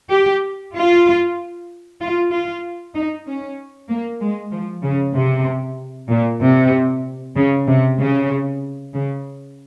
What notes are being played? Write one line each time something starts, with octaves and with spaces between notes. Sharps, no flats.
G4
F4
F4
F4
D#4
C#4
A#3
G#3
F3
C#3
C3
A#2
C3
C#3
C3
C#3
C#3